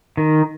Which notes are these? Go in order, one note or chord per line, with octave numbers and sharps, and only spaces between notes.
D#3